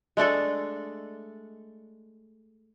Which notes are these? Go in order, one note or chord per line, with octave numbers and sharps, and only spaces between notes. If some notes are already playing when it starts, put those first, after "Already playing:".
G#3 A3 D4 A4